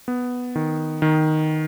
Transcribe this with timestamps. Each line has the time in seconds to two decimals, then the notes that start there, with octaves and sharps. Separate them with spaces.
0.08 B3
0.55 D#3
1.02 D#3